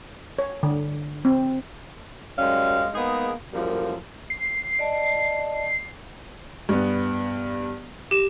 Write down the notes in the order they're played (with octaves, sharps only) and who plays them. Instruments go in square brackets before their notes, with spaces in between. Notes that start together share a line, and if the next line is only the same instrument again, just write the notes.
[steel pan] C#5
D3
C4
[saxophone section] F#2 G3 G#3 C#4 F5
G#3 A#3 B3 D#4 G#4
F#2 A2 F3 G3 A#3
[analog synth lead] C7
[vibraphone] D5 D#5 A5
[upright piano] G2 B3
[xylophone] G4 E7